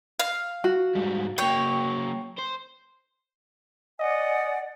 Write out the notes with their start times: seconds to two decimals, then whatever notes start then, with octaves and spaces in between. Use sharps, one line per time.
0.19 F5
0.64 F#4
0.95 G#2 G3
1.38 F#3 A#3 C#5 G5
2.39 C5
3.99 D5 D#5 F#5 G#5